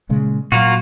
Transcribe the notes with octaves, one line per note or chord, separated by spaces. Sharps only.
A#2 C#3 G#3
A#2 F#3 A#3 F4 F#4